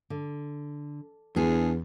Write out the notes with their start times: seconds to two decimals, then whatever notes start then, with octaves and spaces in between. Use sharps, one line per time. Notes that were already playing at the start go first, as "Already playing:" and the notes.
0.10 D3
1.36 E2 D4 G#4